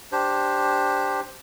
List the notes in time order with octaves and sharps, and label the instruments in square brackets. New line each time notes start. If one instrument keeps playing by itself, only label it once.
[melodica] D4 G4 C5